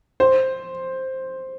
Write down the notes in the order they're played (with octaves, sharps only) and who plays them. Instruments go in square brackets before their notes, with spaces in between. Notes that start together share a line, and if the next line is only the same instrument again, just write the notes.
[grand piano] C5